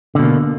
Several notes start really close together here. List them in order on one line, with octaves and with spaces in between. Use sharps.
D3 B2 A#3